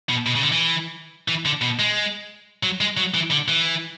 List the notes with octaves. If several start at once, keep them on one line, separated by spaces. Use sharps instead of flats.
B2
B2
C#3
D3
E3
E3
D3
B2
G#3
F#3
G#3
F#3
E3
D3
E3